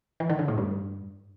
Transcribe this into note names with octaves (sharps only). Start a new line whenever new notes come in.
E3
D#3
D3
A2
G2